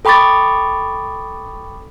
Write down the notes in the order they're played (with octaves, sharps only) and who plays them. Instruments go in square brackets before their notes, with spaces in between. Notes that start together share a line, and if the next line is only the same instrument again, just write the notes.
[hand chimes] A4 G5 B5 C#6 D6 A6